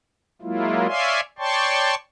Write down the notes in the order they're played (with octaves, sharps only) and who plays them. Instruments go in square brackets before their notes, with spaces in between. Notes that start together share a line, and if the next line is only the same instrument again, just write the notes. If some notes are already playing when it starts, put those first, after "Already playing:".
[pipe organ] F#3 G#3 A#3 E4 F4
C#5 D5 E5 F5 G#5 C6
C#5 D5 G5 A5 C6 C#6